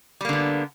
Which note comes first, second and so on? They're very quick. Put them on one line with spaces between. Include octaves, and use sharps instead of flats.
G3 A#3 D3 B3